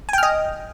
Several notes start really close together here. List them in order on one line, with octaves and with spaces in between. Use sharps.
G#5 G5 F6 D#5